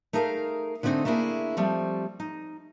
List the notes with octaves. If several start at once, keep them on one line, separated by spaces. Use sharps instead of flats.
A3 D#4 G#4 A#4 F5
D3 G#3 A3 C4 D#4
A3 A#3 D4 E4 G#4
F3 G3 A3 C4
D#4